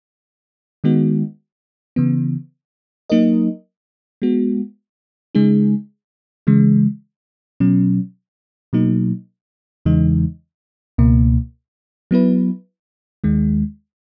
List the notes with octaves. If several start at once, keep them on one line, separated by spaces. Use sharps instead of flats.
D#3 G#3 B3 D#4 F#4
C#3 E3 B3
F#3 A#3 D#4 A#4 D#5
G#3 B3 F#4
C#3 G#3 D#4 G#4
C#3 E3 G#3
B2 F#3 C#4
B2 F#3 A#3 D#4
E2 C#3 E3 G#3 D#4
C#2 B2 A#3
F#3 B3 E4 B4
D#2 D#3 G#3